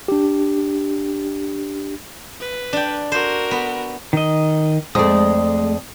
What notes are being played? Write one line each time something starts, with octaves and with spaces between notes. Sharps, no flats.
D4 G4
B4
D4 G5
F#4 A#4 C5
B3
D#3 D#5
F2 G#3 A3 D5 D#6